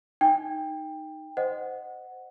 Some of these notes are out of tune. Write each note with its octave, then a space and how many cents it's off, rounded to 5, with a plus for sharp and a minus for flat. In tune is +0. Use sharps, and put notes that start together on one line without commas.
D#4 +0 G5 +15
C5 -15 D#5 -20 F#5 +0